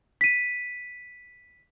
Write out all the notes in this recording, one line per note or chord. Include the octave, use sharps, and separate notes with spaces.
B6 D#7